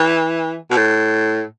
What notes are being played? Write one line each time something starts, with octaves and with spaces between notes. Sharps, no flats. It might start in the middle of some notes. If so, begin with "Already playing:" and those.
Already playing: E3
B2
A2